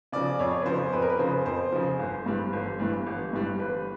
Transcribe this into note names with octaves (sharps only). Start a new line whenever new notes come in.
C#3 F3 D5
F2 C#5
B4
C#3 F3 C5
F2 B4
A#4
B4
C#3 F3 C5
F2 C5
C#3 F3
G1
G2 E3 G3
G1
G2 E3 G3
G1
G2 E3 G3
G1 B4